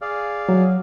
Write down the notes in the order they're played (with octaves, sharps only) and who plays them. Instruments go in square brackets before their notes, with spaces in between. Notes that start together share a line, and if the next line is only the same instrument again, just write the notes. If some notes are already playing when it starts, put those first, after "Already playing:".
[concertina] G#4 D5 F5
[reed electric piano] F#3